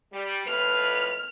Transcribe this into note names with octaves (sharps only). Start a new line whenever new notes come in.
G3
F2 A2 B4 F6